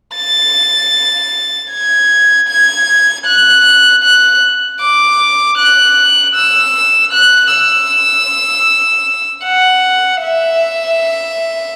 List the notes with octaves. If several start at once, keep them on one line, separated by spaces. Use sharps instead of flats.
A6
G#6
G#6
F#6
F#6
D6
F#6
E6
F#6
E6
F#5
E5